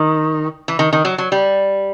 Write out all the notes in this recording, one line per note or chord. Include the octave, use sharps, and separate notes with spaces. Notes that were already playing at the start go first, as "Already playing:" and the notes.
Already playing: D#3
E3
D#3
D#3
F#3
F#3
G3